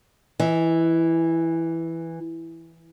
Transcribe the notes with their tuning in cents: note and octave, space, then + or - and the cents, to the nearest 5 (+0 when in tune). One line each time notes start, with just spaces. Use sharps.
E3 +0 D#5 +45